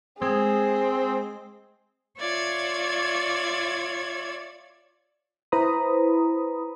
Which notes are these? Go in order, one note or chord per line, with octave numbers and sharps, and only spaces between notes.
G#3 C4 G#4
F4 C#5 D5 E5 G#6
E4 B4 C5 A#5 B5 D#6